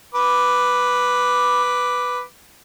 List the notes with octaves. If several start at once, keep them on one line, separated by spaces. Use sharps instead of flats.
B4 D6